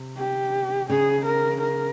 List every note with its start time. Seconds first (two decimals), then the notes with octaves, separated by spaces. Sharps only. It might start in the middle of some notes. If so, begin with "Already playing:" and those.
Already playing: C3
0.17 G4
0.89 C#3 G#4
1.26 A#4
1.62 A#4